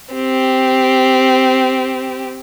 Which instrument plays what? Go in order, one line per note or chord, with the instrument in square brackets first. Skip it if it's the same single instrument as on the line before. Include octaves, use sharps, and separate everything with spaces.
[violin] C4 G4